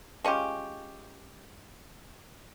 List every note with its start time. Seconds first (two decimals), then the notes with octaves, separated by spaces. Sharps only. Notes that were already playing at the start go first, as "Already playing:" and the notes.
0.24 G#3 C#4 F4 G4